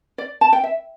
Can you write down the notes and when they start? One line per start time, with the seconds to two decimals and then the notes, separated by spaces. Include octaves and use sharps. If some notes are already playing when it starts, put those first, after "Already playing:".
0.18 D5
0.41 A5
0.53 G5
0.64 E5